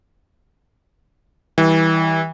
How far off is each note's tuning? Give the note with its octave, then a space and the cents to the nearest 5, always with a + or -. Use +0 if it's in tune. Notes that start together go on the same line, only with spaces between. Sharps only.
E3 -25 G3 -5